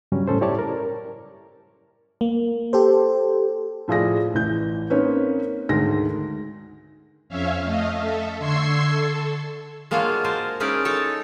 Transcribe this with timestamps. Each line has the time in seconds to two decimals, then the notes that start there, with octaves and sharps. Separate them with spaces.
0.12 G2 C#3 F#3 G3 C#4
0.28 A2 C#4 A4 C5
0.41 E4 G4 C#5 D5 A5
0.59 A#4
2.21 A#3
2.73 G4 A4 C5
3.88 A2 F3 F4 G#4 D5 A#6
4.34 A1 E3 G6
4.90 A#3 C4 C#4 D#4 B4 C#5
5.69 D2 G#2 D#3 G#3 A#6
7.29 F2 C#4 C#5 E5 F5
7.64 A3 D#5 F5
7.97 A4 E5
8.39 D3 C6 C#6 E6 G#6 C7
8.87 A4
9.91 G#3 A#3 D4 F4 F#4 C#5
10.24 A#4 C5 G#5 A5
10.60 G#3 C#4 D#4 E4 A#4 D5
10.85 D#4 A4 C#5 A5